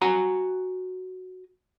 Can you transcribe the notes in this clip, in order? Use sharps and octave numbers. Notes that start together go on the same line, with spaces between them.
F#4 G#5 A#5